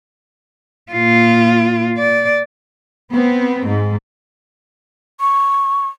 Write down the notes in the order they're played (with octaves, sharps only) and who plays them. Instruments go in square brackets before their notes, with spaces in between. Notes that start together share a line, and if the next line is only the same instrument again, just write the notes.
[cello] A#2 F4
D5
[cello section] B3 C4
G#2
[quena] C#6